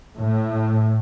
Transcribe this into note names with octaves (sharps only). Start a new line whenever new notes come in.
A2